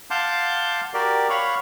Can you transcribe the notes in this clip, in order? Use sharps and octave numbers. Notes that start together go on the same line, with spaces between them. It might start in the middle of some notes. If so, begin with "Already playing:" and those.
F5 F#5 A5 C6 D6 G6
F#4 G4 A#4 D5
C#5 F5 F#5 B5 C#6